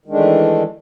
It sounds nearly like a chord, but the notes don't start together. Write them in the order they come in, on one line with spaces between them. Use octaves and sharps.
D#3 G#3 D4 A3 E3